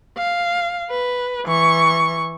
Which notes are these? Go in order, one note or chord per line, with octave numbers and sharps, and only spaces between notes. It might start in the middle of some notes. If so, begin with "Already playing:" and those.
F5
B4
E3 C#6